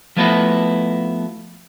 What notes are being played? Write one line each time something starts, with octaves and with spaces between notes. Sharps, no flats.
F3 A3 B3 E4 F#4 B4